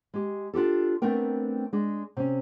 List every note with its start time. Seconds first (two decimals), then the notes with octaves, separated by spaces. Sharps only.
0.14 G#3 G4
0.54 D4 F4 G4 A4
1.02 A3 B3 C4 D4 A#4 G5
1.73 G#3 D4
2.17 C3 C#4